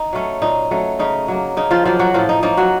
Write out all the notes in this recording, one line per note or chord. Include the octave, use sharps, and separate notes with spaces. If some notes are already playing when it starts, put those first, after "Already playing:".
Already playing: D#4
F#3 A3 C#4
A#2 D#4
F#3 A3 C#4
C#3 D#4
F#3 A#3
C#3 D#4
F3 F4
F3 F#3 A#3 F4
F#3 F#4
A2 F3 F4
D#4
F3 A#3 C#4 D#4
F#3 F#4